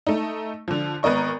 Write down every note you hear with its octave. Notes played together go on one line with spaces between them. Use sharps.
A3 D#4
D3 F3
G#1 B3 A#4 D#5 C#6